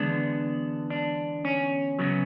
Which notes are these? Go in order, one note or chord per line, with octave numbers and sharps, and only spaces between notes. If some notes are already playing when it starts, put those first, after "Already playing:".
Already playing: E2 D3 G#3 B3 D4
D4
C#4
F#2 C#3 F#3 B3